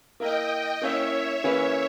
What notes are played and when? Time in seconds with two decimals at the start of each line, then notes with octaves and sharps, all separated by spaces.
0.20 A#3 E4 A#4 D#5 G5
0.82 A#3 C#4 E4 C#5 E5
1.12 C#5 E5
1.43 E3 A#3 C#4 G#4 B4 C#5 E5